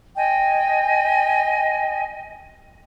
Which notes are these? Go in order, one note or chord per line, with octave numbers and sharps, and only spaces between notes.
D#5 G5 G#5